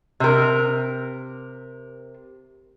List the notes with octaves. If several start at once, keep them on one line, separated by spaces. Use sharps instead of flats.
C3 A#4